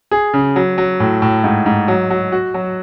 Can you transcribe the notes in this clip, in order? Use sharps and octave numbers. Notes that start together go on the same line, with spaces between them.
G#4
C#3
F#3
F#3
A2
A2
G#2
G#2
F#3
F#3
F#4
F#3